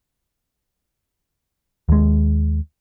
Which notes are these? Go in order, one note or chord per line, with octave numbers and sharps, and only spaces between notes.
D#2 G#3